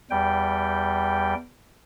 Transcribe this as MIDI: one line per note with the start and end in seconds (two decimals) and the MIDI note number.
0.11 1.34 40
0.11 1.34 55
0.11 1.34 79